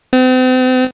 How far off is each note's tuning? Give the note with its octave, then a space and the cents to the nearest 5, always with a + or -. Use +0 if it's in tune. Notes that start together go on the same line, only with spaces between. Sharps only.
C4 -40